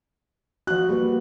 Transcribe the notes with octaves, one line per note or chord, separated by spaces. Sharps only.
F3 F#4 F#6
G3 A#3 B4